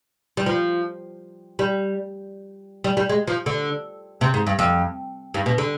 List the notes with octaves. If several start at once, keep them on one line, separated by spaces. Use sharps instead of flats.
G3
F3
G3
G3
G3
G#3
F3
D3
C3
G#2
G2
F2
G2
B2
D3